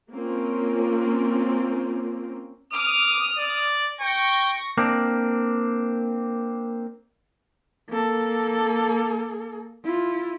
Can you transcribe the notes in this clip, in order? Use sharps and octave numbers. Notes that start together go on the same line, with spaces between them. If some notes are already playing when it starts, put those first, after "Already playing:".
A#3 C4 C#4 F4
D6 D#6 F6
D5
G5 C#6 A#6
A#3 C4 D4
A#3 A4
E4 F4